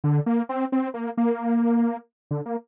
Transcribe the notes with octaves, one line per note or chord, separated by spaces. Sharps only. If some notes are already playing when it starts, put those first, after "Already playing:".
D3
A#3
C4
C4
A#3
A#3
D3
A#3